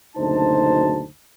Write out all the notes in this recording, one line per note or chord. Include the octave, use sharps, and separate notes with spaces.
F#1 D2 B2 D#4 C5 A5